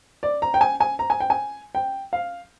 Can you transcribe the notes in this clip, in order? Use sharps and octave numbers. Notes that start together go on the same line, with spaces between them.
D5
A#5
G5
G#5
G#5
A#5
G#5
G5
G#5
G5
F5